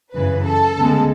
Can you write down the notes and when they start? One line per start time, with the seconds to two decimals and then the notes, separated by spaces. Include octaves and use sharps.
0.14 F#2 C#3 E3 B4
0.45 A4
0.76 D2 C#3 G#3 B3